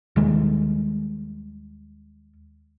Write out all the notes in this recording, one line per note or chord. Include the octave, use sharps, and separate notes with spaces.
D#2 D#3 G3 G#3